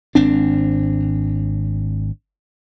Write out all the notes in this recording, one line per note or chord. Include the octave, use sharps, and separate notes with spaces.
G#1 C4 D4